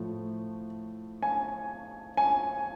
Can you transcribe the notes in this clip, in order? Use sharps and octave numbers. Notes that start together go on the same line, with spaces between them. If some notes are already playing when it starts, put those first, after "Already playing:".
Already playing: A2 F3 A3
G#5
G#5